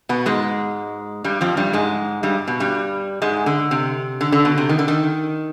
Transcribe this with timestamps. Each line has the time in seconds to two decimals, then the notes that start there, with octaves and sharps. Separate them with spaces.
0.09 B2 B3
0.26 G#2 G#3
1.24 G2 G3
1.41 F2 F3
1.57 G2 G3
1.73 G#2 G#3
2.23 G2 G3
2.48 B2
2.60 G2 G3
3.22 G#2 G#3
3.46 D3
3.71 C3
4.21 D3
4.32 D3
4.45 B2
4.58 C3
4.69 D#3
4.79 D3
4.88 D#3